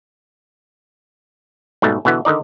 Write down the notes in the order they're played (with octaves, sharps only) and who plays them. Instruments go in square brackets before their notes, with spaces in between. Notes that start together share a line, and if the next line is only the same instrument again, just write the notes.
[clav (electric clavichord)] G#2 B2 G3 A3
B2 D3 E3 B3
D3 D#3 D#4 D5